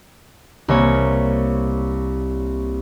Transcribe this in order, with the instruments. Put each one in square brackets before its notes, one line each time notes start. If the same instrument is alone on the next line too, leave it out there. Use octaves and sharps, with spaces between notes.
[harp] C2 A#3 C#5